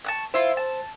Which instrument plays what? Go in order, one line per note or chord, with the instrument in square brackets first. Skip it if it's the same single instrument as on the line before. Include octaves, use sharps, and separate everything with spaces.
[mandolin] A5 C#6 F#6
[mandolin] E4 F4 [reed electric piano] C5
[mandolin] A5